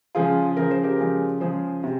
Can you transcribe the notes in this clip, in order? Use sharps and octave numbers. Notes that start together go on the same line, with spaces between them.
C#3 F3 G#3 F4 G#4
C#3 F3 G#3 A#4
C5
G4 A#4
C#3 F3 G#3
C#3 F3 G#3 G#4 C5
C3